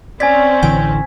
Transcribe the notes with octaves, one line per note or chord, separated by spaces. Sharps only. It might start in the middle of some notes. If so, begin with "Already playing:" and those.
C4 C#4 D5 G#5 G#6 B6
A1 D3 E3 G5